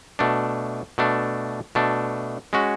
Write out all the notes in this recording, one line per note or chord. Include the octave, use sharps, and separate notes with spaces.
B2 A3 D4
B2 A3 D4
B2 A3 D4
G#3 C#4 F#4